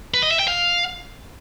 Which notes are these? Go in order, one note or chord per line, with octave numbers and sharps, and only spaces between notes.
B4
D#5
E5
G5
F5